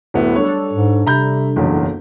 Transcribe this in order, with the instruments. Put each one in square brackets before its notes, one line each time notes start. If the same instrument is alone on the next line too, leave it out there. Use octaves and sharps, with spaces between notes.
[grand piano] D1 B3 E4
[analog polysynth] G3 D4 A4 [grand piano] C#5
[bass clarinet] G#2
[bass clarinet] C3 [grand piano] A#5 B5 G6
[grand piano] F#1 B1 E2